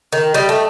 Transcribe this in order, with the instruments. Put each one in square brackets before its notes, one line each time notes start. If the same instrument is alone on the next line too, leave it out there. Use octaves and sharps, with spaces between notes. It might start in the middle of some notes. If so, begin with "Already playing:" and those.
[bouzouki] D#3
[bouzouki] G3 [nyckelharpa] D#5
[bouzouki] A3